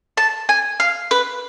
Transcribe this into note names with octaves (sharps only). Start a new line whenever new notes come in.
A5
G#5
F5
B4